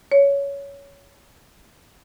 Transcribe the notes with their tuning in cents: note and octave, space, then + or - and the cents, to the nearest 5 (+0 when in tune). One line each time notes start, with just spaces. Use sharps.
C#5 +15